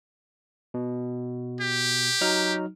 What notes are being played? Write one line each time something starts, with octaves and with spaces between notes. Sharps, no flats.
B2
G4
F#3 D#4 F6